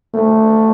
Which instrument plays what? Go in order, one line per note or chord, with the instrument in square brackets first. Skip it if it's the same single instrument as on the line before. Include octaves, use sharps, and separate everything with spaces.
[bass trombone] A3